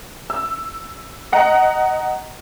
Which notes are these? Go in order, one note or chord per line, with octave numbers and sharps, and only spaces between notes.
E6
D#5 F#5 A#5